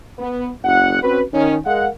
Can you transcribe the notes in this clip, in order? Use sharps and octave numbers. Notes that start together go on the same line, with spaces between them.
B3
F#1 F#5
C4 C#4 F#4 B4
D#3 C#4
G#3 A#4 F5 F#5